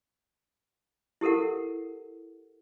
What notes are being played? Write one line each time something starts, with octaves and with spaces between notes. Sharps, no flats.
E4 G4 A4 A#4 F#5